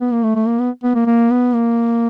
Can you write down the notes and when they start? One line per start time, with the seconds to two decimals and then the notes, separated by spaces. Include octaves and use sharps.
0.01 B3
0.12 A#3
0.23 A3
0.36 A3
0.47 A#3
0.59 B3
0.84 B3
0.95 A#3
1.06 A#3
1.31 B3
1.54 A#3